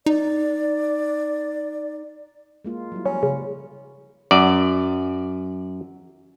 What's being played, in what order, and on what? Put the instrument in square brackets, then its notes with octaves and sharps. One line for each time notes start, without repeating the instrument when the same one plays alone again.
[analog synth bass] D#4 [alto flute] D5
[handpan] G#3 A#3 F4
F#3 G3 E4
[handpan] F3 [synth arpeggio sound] F#3 [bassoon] C#4
[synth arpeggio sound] C#3
[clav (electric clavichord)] F#2 D5